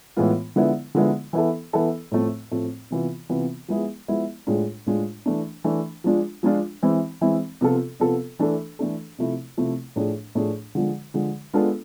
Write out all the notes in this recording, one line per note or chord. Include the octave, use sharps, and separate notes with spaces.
A2 E3 G#3 B3 F4
D3 F3 G#3 B3 E4
D3 F3 G#3 B3 E4
E3 B3 E4 A4
E3 B3 E4 A4
A2 F3 A3 C4
A2 F3 A3 C4
C3 E3 B3 F4
C3 E3 B3 F4
F3 G#3 B3 E4 G#4
F3 G#3 B3 E4 G#4
A2 G#3 D4 F4 G#4
A2 G#3 D4 F4 G#4
E3 A3 D4
E3 A3 D4
F3 G#3 D4 F4
F3 G#3 D4 F4
E3 G#3 C4 E4
E3 G#3 C4 E4
C3 F3 B3 F4 A4
C3 F3 B3 F4 A4
E3 A3 D4 A4
E3 A3 D4 A4
C3 F3 A3 E4
C3 F3 A3 E4
A2 F3 A3 D4 G#4
A2 F3 A3 D4 G#4
D3 F3 G#3
D3 F3 G#3
G#3 B3 D4 F4 A4